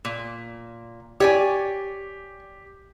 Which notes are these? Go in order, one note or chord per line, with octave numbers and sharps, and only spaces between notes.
A#2
G4 C#5 D5 G#5